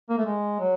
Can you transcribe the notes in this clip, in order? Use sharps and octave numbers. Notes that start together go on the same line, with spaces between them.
A#3
A3
G#3
F#3